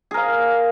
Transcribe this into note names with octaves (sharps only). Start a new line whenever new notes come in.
G#4 A#4 F5